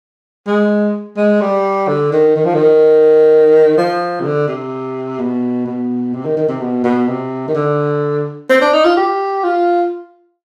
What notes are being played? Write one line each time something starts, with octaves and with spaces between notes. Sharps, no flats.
G#3
G#3
G3
D3
D#3
D#3
F3
D#3
F3
C3
D3
C3
B2
B2
C3
D#3
D#3
C3
B2
B2
C3
D#3
D3
C4
D4
D#4
F4
G4
F4